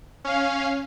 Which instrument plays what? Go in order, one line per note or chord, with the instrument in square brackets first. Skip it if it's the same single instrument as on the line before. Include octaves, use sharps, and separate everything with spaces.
[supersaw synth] C#4 F5